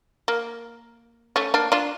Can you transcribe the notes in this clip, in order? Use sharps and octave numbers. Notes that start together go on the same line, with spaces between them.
A#3
A3 C#4
A#3 D4
D4 F4